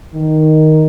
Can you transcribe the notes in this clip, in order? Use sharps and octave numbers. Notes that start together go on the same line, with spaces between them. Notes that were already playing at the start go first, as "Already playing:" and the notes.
D#3